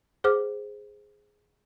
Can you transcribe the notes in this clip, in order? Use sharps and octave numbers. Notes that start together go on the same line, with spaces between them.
G#4 C5 F#5 D6 F6